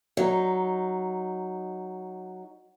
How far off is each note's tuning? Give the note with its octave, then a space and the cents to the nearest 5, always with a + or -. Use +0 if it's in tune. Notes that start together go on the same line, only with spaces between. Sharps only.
F#3 +0 D#4 +0